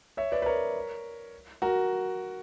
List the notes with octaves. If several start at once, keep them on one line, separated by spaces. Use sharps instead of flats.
C#5 E5
B4 D5
B4
A#4 C#5
F#4 A#4